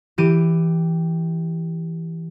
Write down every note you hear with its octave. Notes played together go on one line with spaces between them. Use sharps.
E3 G4 D#7